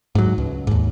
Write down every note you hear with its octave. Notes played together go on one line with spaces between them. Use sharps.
G#2 F#3
C#2
D#2 G#2